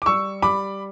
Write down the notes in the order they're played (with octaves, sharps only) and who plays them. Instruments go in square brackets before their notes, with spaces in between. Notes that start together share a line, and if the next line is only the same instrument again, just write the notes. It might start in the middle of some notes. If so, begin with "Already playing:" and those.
[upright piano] D6
G3 C#6 E6
G3 B5 D6